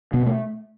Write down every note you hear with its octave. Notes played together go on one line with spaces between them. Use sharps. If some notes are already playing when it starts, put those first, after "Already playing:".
B2 B3
A3